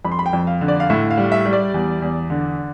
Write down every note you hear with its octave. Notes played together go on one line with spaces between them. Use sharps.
F2 B5
C6
B5
G5
F2
F5
D3
D5
F5
A2 E5
F5
G3
E5
G3
D5
E2
E2
D3